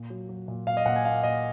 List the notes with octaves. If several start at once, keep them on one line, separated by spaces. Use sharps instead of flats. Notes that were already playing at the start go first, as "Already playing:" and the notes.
Already playing: A#2
F#3
F#3
A#2
A#2 F5
D#5
A#2 F#5
G#5
A#3 F5
A#2 D#5